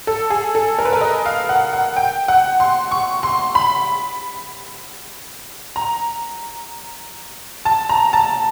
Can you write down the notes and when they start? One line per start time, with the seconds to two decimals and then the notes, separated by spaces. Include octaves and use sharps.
0.07 A4
0.30 G#4
0.55 A4
0.79 A#4
0.85 B4
0.93 A#4
1.01 D#5
1.26 F5
1.49 F#5
1.73 F#5
1.96 G5
2.28 F#5
2.60 C6
2.91 C#6
3.23 C6
3.55 B5
5.76 A#5
7.65 A5
7.89 A#5
8.13 A5